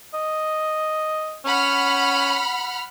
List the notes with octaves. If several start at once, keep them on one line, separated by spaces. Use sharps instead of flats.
D#5
C#4 F#5 B5 F6